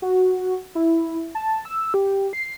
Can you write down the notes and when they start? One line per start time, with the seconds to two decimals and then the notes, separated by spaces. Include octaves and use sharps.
0.02 F#4
0.75 E4
1.35 A5
1.65 E6
1.94 G4
2.33 C7